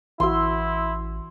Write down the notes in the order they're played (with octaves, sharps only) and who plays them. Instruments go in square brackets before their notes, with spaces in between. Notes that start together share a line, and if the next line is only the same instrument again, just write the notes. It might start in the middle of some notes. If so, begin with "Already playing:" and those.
[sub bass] A1 [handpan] E3 F#4 [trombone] E4 [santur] C6 E6